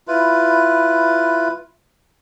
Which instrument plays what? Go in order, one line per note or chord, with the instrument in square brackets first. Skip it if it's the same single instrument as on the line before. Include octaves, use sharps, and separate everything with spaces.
[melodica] E4 F4 B4